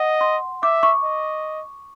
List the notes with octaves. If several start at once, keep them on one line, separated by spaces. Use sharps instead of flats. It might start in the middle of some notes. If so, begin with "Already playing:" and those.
Already playing: D#5 F#5
C6
E5 D6
C#6
D#5